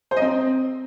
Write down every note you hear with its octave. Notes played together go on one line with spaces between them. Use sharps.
C5
D#5
C4